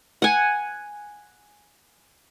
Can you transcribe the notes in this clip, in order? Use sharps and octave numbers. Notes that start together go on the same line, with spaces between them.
F#5 G#5